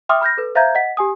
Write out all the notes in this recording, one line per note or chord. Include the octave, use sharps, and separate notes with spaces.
E5 G5 C6 D6 D#6 F6
B5 F6 G6 A#6
A4 B4
C5 E5 F5 A#5 G6 G#6
D#5 F#5 B6
G4 G#5 D#6